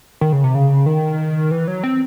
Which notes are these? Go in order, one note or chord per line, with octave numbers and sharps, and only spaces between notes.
D#3
C#3
C3
C#3
D#3
E3
F#3
C4